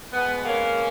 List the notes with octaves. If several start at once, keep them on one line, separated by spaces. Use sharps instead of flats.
B2 G#3 B3
A#3 C#4